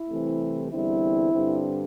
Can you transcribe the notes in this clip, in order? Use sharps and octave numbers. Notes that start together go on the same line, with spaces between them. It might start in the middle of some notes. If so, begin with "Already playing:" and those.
Already playing: E4
C2 C3 E3 A3 C4
E2 D3 G3 C4 E4
G2 D3 C4